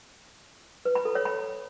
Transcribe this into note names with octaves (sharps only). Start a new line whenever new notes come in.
B4
B5
A4
C#5
B5